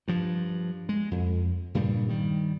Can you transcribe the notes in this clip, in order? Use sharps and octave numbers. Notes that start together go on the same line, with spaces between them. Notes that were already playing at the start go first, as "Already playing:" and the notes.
G2 F3
G#3
F2
G2 A#2 C#3 G3
D#3 G3